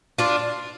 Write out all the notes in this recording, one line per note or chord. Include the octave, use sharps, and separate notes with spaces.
D4 F4